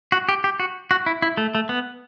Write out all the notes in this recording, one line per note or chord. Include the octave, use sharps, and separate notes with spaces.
F#4
G4
G4
F#4
F#4
E4
E4
A3
A3
B3